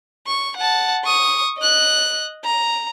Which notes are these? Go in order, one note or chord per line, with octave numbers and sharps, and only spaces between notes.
C#6
F#5 A5
C#6 D#6
D#5 F#6
A#5